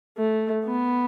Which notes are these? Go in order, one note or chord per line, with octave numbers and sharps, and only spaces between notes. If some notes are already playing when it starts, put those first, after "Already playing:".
A3
B3